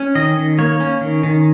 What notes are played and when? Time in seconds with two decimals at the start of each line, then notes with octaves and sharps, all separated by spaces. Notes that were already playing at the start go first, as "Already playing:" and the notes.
Already playing: C#4
0.15 D#3 D#5
0.37 D#3
0.59 A#3 C#5
0.80 C#4
1.01 D#3
1.23 D#3